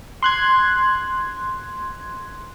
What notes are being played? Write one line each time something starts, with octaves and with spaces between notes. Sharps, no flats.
C6 F#6 G#6